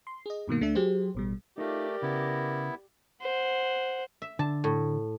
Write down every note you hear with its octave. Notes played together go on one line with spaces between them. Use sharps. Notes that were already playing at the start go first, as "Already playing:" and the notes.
C6
G#4 D#5
G2 B2 D#3 A#3
D2 A3 D4 E5
F#3 G4 G#4 C5
A1 B2 G3
A3 D#4 F4 G4 A#4 D5
C#3 B3 E4
C5 F#5
E5
D3 A5
A2